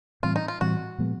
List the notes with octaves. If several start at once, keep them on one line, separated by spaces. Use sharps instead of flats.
A2 E3 G3 C4 F4
D#4
F4
A2 E3 G3 C4 F#4
A#2 F3 G#3 B3